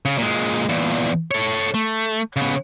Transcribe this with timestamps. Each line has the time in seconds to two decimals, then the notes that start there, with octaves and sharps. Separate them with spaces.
0.05 C#3
0.18 A#2 G#3
0.69 E2 A#2
1.31 A4 C#5
1.74 A3
2.36 C#3 B3